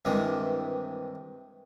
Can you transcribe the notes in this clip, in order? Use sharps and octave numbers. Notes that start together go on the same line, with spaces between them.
C2 G2 D#3 E3 G#3